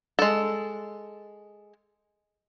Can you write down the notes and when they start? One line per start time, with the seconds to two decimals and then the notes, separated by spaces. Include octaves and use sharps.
0.19 G#3 A4